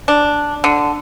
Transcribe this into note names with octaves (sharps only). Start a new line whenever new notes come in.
D4
D3